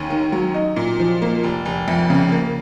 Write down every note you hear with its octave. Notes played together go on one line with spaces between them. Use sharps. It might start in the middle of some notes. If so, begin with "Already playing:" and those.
Already playing: D#2 C#4
D#3
F#3
D#4
A#2
F3
A#3
F1
F1
F2
C#3
A#3